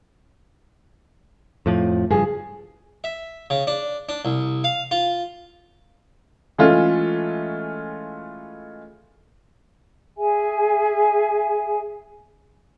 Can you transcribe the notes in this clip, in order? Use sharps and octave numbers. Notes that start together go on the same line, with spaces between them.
F2 A2 F3
F#1 G2 F3 G#4
E5
C#3
D4
D4
C2
F5
F4
E3 G#3 A3 C#4 F4
G#4 E5 G#5